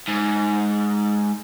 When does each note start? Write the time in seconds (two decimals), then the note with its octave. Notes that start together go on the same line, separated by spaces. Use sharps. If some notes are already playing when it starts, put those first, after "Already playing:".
0.08 G#2